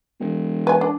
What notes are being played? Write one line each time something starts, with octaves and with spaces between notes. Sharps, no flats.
E1
B4 G#5
D4